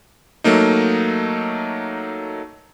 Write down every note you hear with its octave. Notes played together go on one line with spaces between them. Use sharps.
F#3 A3 A#3 D#4